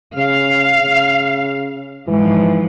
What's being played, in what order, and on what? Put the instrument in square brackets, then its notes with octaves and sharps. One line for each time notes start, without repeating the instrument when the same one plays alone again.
[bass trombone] C#3 [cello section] F5
[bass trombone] C#3
[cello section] G#2 F3 [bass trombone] E3